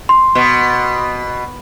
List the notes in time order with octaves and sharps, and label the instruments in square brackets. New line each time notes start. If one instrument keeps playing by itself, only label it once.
[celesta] C6
[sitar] B2